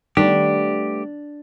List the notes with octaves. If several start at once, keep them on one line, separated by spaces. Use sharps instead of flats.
D#3 G3 A3 B3 D4 G4